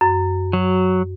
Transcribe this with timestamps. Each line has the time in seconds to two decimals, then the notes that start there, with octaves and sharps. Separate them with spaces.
0.01 F#2
0.53 F#3